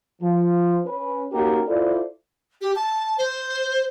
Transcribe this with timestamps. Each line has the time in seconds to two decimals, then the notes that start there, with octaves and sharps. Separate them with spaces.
0.21 F3
0.85 C#4 B4
1.32 A#3 C#4 D#4 F#4 G4 A#4
1.67 E4 F4 A4 C5 D5
2.61 G4
2.76 A5
3.18 C5